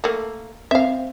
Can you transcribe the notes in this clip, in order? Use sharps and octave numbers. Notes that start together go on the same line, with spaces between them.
A3 A#3
C4 E5 F5